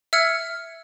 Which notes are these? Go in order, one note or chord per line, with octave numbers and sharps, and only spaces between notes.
E5 E6 F6 G#6 C#7